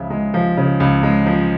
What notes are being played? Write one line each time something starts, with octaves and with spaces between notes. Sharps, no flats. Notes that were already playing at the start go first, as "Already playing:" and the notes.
Already playing: C#2 C#3 F3 E5
G#3
F3
C#3
C#2
G#3
F3